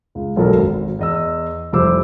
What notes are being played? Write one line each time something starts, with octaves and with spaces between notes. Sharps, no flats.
C#2
E1 B1 F#2 A4 A#4
G#1
E2 D#5 E6
F1 C2 C5 D6 E6